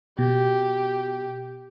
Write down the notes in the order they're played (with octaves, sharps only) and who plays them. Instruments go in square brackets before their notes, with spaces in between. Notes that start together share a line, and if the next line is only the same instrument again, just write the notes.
[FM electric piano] B2 [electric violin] G4